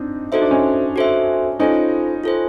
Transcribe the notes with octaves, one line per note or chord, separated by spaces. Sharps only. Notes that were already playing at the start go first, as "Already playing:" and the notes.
Already playing: C4 D4 D#4
D#4 F#4 A4 C5 E5
D4
C#4 D#4
F#4 A4 C5 E5
C#4 D#4 F4 A4 C5
F4 A4 C5